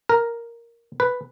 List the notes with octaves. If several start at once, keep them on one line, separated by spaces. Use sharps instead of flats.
A#4
B4